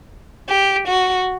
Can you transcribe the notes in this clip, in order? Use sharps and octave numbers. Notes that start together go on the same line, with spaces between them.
G4
F#4